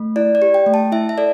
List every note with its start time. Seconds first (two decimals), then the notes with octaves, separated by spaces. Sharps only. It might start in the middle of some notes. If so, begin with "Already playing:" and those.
Already playing: A3
0.16 E4 D5
0.35 D5
0.42 G4
0.54 G5
0.66 A3
0.74 A5
0.92 E4 E5
1.09 E5
1.18 A4 D5